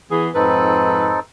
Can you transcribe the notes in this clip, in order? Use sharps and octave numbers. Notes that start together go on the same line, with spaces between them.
E3 B3 G#4
F2 G#2 C4 D#4 A4 B4